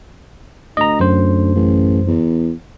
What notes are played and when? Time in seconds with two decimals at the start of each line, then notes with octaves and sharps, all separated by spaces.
0.77 D2 D#5 A#5
1.00 F#2 C5
1.55 A1
2.07 E2